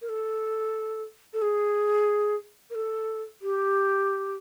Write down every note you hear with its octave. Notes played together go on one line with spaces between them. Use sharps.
A#4
A4
A4
G#4
A#4
A4
G4